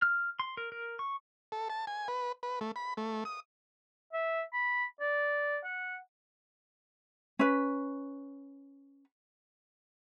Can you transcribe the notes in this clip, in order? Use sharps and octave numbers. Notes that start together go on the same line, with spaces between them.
F6
C6
A#4
A#4
C#6
A4
A5
G#5
B4
B4
A3
B5
A3
D#6
E5
B5
D5
F#5
C#4 B4